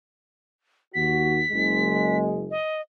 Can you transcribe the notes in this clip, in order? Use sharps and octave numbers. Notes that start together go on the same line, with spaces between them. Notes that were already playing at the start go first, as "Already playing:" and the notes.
D#2 F#4 B6
F#1 G#3
D#5